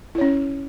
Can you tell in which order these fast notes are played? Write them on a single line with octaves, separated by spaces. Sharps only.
E4 C#5 C#4